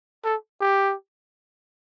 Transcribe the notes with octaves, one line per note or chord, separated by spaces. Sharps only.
A4
G4